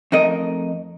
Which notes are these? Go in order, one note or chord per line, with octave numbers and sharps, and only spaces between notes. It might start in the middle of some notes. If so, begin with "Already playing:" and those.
F2 A3 D#4 A#4 D#5